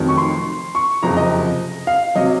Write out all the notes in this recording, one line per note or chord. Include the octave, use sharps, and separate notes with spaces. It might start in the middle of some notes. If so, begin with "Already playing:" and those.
Already playing: F1 F2 D#3 F#3
C#6
C6
C#6
F#1 F2 C3 F3 A#5
D#5
F5
C3 F#3 D#5